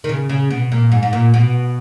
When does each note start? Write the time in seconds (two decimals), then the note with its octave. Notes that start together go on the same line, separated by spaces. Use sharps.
0.04 D#3
0.09 C#3
0.29 C#3
0.51 B2
0.72 A#2
0.92 G#2
1.03 G#2
1.13 A#2
1.34 B2